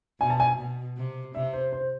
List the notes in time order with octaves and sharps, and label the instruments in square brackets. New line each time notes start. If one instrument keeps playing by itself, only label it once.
[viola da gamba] B2 [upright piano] G#5
[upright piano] A5
G#5
[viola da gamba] B2
C3
[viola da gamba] C3 [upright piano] E5
[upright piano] C5
C5